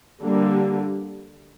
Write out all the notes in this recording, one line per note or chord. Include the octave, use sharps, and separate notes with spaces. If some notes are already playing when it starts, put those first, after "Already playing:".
D3 G3 A#3